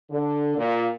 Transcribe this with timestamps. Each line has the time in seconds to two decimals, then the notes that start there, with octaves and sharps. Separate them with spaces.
0.11 D3
0.57 A#2